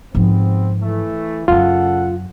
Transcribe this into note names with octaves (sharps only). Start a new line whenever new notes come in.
G#2 C3 F3 B3 C4
E3 A3
F#2 C#3 F#3 F4 A4 F#5